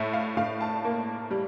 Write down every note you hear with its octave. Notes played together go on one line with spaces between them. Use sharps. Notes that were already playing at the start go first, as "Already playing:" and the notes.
Already playing: A2 E5
F5
A2 F5
A5
A#3
G3